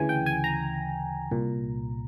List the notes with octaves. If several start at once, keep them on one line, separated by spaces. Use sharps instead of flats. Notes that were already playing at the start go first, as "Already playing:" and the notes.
Already playing: D2 C#3 E3 G#5
G5
G#5
A#5
C2 A#2